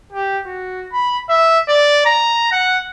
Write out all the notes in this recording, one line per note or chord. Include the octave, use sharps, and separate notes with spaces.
G4
F#4
B5
E5
D5
A#5
F#5